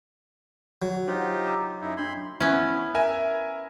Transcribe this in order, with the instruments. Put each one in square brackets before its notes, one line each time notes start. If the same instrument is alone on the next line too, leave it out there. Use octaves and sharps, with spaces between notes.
[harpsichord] F#3
[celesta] D4 C5 F#5 [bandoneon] D#4 F4 G4
[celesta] A#5 D6 E6
[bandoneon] F#2 D#4 E4
[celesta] D4 G#6 [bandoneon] B5 C6
[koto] B3 C#4 [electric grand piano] E4
[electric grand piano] A#4 E5 G#5